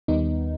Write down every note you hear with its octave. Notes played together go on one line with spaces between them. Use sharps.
D#2 D#3 G3 B3 D#4